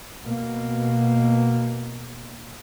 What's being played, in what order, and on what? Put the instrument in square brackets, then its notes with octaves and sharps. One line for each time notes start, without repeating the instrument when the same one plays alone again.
[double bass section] B2 A#3